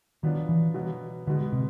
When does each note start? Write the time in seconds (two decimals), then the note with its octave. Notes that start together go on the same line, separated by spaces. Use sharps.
0.23 D#3 F#3 B3 D4 F4
0.49 E3
0.74 B2 F#3 B3
1.27 B2 D3 G#3 B3
1.53 C3